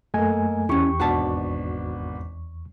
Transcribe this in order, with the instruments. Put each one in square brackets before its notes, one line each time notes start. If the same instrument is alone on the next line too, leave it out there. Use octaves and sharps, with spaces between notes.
[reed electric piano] F#2 A3 G#5 [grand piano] A#3 A4 D#5
[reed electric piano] E2 C#6 [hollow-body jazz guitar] C#4 E4 [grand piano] G4
[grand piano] G#1 B2 D4 [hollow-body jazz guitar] F#4 F#5 A5